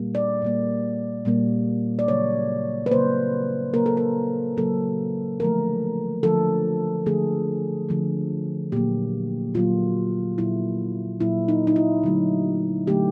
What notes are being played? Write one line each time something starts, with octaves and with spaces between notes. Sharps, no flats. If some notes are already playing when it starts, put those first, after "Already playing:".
Already playing: A#2 G3 A#3
D5
A#2 G3 A#3
A#2 G3 A#3
D5
C#3 F#3 A#3 C#5
B4
C#3 F#3 A#3 C5
C#3 F#3 A#3 A#4
A4
A#4
C#3 F#3 A#3 A4
D3 F3 A3 A#4
D3 F3 A3 A4
D3 F3 A3 G#4
D3 F3 A3
A#2 F#3 A#3 G4
A#2 F#3 A#3 F4
A#2 F#3 A#3 E4
A#2 F#3 A#3 E4
D#4
D#4
E4
D3 F#3 A3
D3 F#3 A3 G4